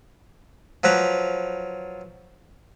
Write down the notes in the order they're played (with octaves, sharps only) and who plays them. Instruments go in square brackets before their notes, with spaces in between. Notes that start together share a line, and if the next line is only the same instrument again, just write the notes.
[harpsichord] F3 F#3 B4 A#5